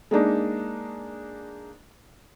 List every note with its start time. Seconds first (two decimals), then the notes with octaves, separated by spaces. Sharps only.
0.11 G#3 A#3 D4 D#4